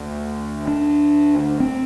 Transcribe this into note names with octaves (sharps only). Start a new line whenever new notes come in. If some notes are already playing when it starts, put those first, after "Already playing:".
Already playing: D2 D3
D4
C4